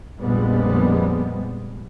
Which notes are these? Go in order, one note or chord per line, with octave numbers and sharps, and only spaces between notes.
A#1 F2 A#2 G3 G#3 B3